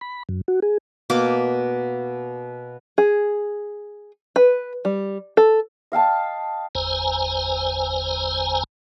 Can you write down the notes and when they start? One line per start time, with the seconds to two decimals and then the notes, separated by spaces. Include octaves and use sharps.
0.01 B5
0.29 F#2
0.48 F#4
0.62 G#4
1.10 B2 A#3 D6
2.98 G#4
4.36 B4
4.85 G3
5.37 A4
5.92 D#5 F5 G5 A5
6.75 G1 E2 C5 G#5 A#5